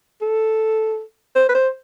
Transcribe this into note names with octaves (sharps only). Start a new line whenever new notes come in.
A4
C5
B4
C5